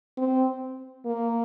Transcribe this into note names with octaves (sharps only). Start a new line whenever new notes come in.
C4
A#3